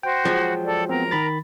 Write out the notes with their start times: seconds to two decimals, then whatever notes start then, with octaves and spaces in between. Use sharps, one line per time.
0.03 F#4 C5 G5
0.25 F3 F#3 G#3
0.66 A4 D5
0.89 B3 C4 A#4 A#5
1.11 D#3 B5 A6